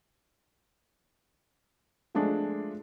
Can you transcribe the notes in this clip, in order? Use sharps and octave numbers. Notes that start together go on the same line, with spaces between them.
F3 G#3 A3 D4